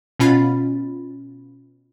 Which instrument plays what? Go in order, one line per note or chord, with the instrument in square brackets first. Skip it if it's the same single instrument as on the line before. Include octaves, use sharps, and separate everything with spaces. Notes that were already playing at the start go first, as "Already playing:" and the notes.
[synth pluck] B2 C#4 F4 B5 A6